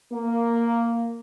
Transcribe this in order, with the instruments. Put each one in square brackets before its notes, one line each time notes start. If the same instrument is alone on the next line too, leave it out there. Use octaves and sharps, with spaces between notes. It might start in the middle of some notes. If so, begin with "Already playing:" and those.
[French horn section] A#3